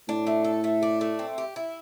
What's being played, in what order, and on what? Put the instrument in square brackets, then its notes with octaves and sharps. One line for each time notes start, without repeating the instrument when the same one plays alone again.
[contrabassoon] A2 [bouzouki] D4
[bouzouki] A3
A4
A3
D4
A3
C4
G4
E4